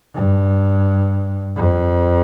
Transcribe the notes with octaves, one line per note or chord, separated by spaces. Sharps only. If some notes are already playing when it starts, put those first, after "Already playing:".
G2
F2